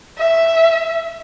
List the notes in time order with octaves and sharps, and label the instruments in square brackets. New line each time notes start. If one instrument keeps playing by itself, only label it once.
[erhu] E5